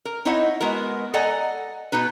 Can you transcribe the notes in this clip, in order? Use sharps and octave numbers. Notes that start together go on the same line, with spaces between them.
A#4
C4 D#4 E4 C#5 D#5 F#5
G#3 B3 F#4 A#4
A4 D5 D#5 F#5 G#5 A#5
B2 B3 D#4 B4